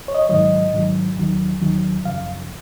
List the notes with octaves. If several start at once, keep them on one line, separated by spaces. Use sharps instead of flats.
C#5
D#5
C#5
G#2 D#3 F#3 D#5
G#2 D#3 F#3
D#2 D#3 F#3
D#2 D#3 F#3
F#2 C#3 F3 F5